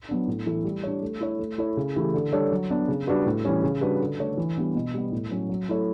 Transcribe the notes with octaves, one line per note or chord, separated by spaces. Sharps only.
F#3 B3 D4
A2
E3 A3 E4 A4
G3
D4 G4 C#5
A3
E4 A4 C#5
A3
E4 A4 C#5
C#3
E3 A3 E4 G4
D3
G3 D4 A4 C#5
F#3
B3 D4
C#3
G3 D4 F#4 B4
A2
E3 G3 C#4
C#3
G3 D4 F#4 B4
D3
A3 D4 A4 C#5
E3
G3 B3 D4
B2
G3 B3
A2
F#3 C#4
F#3
A3 E4 A4 C#5